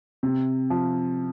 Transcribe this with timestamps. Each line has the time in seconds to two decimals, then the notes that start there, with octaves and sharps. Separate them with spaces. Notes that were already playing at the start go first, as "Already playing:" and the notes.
0.23 C3
0.70 F3